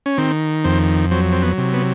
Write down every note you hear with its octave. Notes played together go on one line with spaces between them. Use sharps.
C#4
D#3 C4
F2 C4
F#3 C4
C4
B3
C3
B3